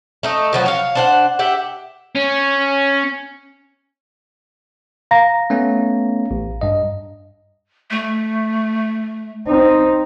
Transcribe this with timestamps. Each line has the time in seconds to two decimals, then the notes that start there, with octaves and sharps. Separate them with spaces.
0.23 A3 D#4 D#5
0.53 B2 F3 F#3
0.66 C#5 F5
0.95 D4 C5 F#5
1.39 G4 E5 F#5
2.16 C#4
5.11 F5 A#5 A#6
5.50 A3 B3 C#4
6.31 A1
6.61 G2 D#5
7.91 A3
9.47 C4 D#4